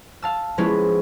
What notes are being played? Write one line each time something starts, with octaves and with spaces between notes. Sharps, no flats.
F5 A5 E6
F3 G#3 B3 C#4 E4 F4